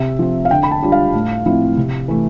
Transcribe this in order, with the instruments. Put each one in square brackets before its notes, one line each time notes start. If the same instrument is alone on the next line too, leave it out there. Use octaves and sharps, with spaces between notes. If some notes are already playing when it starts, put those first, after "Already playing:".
Already playing: [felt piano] C3 E5
F3 C4
F5
D3 G5
B5
A5
G3 D4 F4
F5
A2
F3 A3 C4 E4
C3
E3 A3